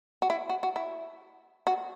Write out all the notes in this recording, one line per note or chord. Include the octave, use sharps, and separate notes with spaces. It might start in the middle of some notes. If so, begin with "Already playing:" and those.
F#4
E4
F#4
F#4
E4
F#4